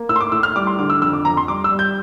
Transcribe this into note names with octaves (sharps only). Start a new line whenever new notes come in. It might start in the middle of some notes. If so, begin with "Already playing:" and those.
Already playing: A#3
A2 E6
C6
D6
A2 E6
F6
G3 D6
C6
D3 D6
E6
F2 E6
D6
F2 A#5
C6
G3 D6
E6
G3
G6